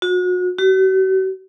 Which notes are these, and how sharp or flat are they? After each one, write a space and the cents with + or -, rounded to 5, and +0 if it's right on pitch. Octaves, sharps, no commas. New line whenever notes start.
F#4 -35
F#4 +45